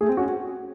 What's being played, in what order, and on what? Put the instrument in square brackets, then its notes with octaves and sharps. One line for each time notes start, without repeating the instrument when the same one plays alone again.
[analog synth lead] A3 [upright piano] G#4
[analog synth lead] C4
[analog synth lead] C#4 [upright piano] F#4